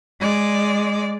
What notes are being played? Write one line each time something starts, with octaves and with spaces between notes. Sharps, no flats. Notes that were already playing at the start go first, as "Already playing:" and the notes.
G#3 D5